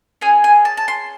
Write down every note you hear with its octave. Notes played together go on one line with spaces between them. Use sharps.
C#4 G#4 G#5
G#5
A5
A5
C6